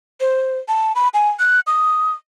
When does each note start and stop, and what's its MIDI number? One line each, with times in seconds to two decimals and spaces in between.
0.20 0.58 72
0.68 0.92 81
0.95 1.08 83
1.14 1.29 80
1.39 1.60 90
1.67 2.11 87